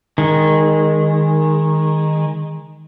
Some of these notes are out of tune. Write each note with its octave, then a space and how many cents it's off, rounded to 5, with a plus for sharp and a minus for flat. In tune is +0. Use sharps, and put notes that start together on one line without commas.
D#3 +0 G#3 -15